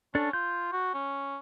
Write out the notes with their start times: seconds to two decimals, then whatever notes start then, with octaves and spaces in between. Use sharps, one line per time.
0.15 C#4 D4 A4
0.33 F4 G6
0.73 F#4
0.94 C#4